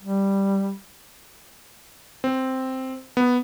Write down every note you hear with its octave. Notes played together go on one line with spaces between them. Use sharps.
G3
C4
B3